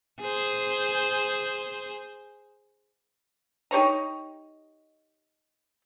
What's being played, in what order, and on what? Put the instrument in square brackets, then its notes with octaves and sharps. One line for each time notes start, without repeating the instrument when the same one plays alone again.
[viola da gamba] G#4 C5
[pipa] D#4 G4 C#5 A#5